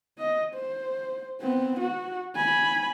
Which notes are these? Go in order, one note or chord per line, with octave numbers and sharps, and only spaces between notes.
D#5
C5
B3 C4
F#4
G#5 B5